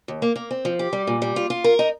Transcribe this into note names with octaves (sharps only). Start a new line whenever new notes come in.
D#2
A#3
A#3
C4
F3
G4
G3
A#2
G3
F4
F4
A#4
D#4